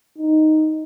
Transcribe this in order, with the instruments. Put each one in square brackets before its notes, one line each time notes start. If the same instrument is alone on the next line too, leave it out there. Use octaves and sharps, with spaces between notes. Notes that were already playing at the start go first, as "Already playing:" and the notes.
[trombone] D#4